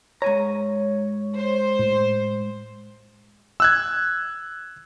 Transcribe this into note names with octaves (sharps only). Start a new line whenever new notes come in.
G#2 C#5 G#5 A#5
C5
A2
E6 F#6 G#6